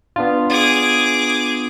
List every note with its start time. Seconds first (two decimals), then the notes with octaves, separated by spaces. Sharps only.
0.16 B3 D4 F4
0.49 G#4 D6